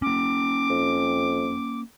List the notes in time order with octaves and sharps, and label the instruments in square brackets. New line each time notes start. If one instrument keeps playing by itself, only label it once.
[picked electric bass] A#3 C#4 [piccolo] D6
[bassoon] F2